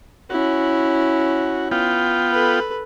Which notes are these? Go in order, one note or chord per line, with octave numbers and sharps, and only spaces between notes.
C#4 E4 F#4
B3 F4 G5
A4 B4